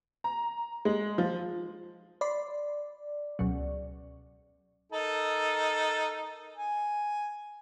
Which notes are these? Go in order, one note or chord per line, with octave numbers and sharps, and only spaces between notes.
A#5
G#3
F3
D5 B5 C6 C7
C#2 B2 F#3
D#4 A4 A#4
G#5